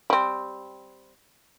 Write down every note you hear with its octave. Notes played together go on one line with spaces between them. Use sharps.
G3 C4